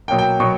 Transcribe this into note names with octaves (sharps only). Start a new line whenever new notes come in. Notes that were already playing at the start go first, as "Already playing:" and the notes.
B2 F#3 A#3 G5
G5
B2 F#3 C#6